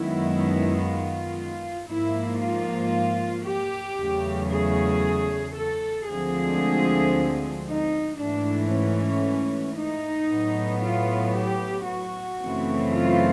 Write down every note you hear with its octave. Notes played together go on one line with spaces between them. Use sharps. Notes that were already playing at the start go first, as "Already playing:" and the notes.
Already playing: F#2 D#3 G#3 B3 E4
F4
G#2 F3 A#3 E4
F4
G4
E2 C#3 F#3 A3
G#4
A4
D2 D3 F3 G#3 C4 G#4
D#4
G#2 E3 A3 D4
C#4
D#4
A2 F#3 B3
F4
G4
F#4
F#2 C#3 E3 A3 C4
F4